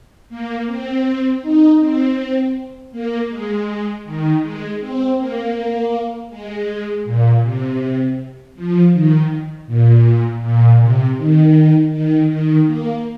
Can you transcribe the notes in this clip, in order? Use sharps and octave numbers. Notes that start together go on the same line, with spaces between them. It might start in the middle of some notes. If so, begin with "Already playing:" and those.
A#3
C4
D#4
C4
A#3
G#3
D#3
G#3
C4
A#3
G#3
A#2
C3
F3
D#3
A#2
A#2
C3
D#3
D#3
D#3
A#3